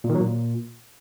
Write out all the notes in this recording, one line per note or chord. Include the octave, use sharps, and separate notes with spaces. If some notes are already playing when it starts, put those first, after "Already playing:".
A#2
D#3
F#3
A#2